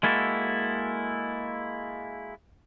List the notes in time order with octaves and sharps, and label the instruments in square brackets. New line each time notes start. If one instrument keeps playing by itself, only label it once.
[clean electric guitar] G#3 A#3 E4 F#4 A4